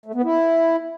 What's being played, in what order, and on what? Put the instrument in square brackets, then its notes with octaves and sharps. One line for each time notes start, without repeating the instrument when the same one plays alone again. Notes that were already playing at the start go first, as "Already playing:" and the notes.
[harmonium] A3
B3
E4